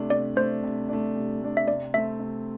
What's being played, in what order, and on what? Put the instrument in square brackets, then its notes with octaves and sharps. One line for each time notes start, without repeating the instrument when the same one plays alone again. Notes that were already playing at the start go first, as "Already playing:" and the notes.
Already playing: [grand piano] C3 A3 D4
[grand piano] C3 [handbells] D5
[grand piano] A3 D4 [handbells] C5
[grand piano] C3
A3 D4
C3
A3 D4
[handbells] E5
[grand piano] C3 [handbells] D5
[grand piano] A3 C4 [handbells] E5
[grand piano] C3